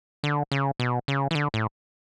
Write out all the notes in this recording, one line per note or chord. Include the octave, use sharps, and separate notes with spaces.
D3
C#3
B2
C#3
E3
D3
A2